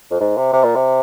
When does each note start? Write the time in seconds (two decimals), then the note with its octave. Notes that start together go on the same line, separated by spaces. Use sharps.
0.11 F2
0.21 G#2
0.37 C3
0.53 C3
0.63 A#2
0.75 C3